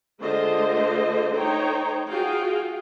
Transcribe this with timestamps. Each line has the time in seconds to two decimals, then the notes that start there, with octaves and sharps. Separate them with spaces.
0.20 D3 G#3 A3 F4 C5 D#5
1.36 A3 D#4 C5 C#5 G5 A#5
2.09 F4 F#4 G#4 F5 G5